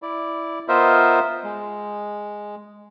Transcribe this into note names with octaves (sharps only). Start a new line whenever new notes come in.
E4 D5
B3 F4 A#4 C5 D#5 E5
G#3